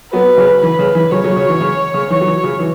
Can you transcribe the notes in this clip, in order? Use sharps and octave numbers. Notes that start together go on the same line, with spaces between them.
F#3 B3 B4
C#3 F#3
E3 B4
C#3
E3
C#3 F#3 C#5
C#3 F#3
C#3 F#3
E3
C#3
C#3
E3 C#5
F#3
E3
C#3 F#3
E3